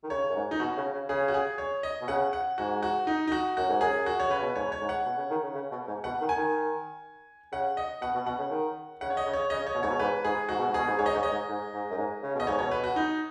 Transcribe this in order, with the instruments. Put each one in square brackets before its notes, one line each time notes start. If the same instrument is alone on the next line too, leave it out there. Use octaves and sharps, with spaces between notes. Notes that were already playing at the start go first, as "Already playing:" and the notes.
[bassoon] D#3
[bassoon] C#3 [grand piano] C#5
[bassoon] F#2
G#2
[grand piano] D#4
[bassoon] B2 [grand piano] F#4
[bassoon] C#3
C#3
[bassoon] C#3 [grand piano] G#4
[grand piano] F#4
G#4
C#5
D#5
[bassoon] B2
[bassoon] C#3 [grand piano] F#5
[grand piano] F#5
[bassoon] G#2 [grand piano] F#4
[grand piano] F#4
D#4
D#4
F#4
[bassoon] F#2 [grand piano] F#4
[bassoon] G#2
[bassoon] F#2 [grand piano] G#4
[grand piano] F#4
C#5
[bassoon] C#3 [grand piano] B4
[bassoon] B2
[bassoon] G#2 [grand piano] C#5
[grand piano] C#5
[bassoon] G#2
[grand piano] F#5
[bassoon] B2
C#3
D#3
C#3
C#3
B2
G#2
[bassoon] B2 [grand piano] F#5
[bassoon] D#3
[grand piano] G#5
[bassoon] D#3
[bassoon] C#3 [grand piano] F#5
[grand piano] D#5
[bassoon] B2 [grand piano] F#5
[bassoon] B2
[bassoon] B2 [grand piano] F#5
[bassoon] C#3
D#3
[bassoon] C#3 [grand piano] F#5
[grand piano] C#5
D#5
[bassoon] C#3
[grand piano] C#5
[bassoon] C#3 [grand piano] D#5
[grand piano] C#5
[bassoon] B2
[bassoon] G#2 [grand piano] C#5
[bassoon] B2
[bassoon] G#2 [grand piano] B4
[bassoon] G#2 [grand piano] G#4
[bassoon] G#2 [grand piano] F#4
[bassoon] B2
G#2
[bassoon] B2 [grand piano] G#4
[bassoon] G#2
[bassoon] G#2 [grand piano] C#5
[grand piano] D#5
[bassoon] G#2 [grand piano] C#5
[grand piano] D#5
[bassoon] G#2
G#2
G#2
F#2
G#2
C#3
B2
[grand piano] D#5
[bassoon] G#2 [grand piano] C#5
[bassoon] B2 [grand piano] C#5
[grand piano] B4
F#4
D#4